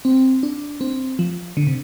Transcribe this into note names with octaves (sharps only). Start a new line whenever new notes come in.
C4
D4
C4
F3
D3
C3